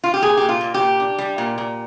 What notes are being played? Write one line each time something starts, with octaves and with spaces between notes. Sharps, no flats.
F4
G4
A#2 G#4
A#2 G4
F4
A#2
G4
A#2
D4
G3
A#2
A#2